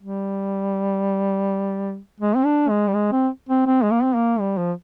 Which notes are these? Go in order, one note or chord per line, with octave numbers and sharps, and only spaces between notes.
G3
G#3
C4
D4
G#3
G3
G#3
C4
C4
C4
G#3
A#3
C4
A#3
G3
F3